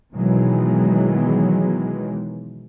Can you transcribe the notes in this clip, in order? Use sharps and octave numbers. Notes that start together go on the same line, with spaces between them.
B2 D#3 E3 F#3 G#3 B3